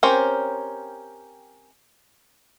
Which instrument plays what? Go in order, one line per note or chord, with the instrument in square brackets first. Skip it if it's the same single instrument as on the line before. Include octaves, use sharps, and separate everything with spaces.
[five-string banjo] C4 C#4 G4 A#4 C5